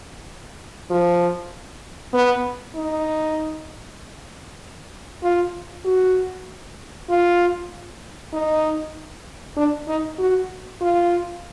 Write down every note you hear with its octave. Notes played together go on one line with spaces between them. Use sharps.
F3
B3
D#4
F4
F#4
F4
D#4
D4
D#4
F#4
F4